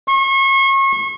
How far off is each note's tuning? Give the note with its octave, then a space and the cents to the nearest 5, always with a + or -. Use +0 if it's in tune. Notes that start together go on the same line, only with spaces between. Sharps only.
C#6 -35